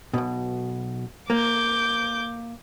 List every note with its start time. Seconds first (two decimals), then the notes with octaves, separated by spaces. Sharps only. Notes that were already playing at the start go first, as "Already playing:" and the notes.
0.14 B1 B2
1.30 A#3 D6 G6